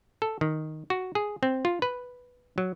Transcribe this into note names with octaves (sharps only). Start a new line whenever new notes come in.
A4
D#3
F#4
G#4
C4
F4
B4
F#3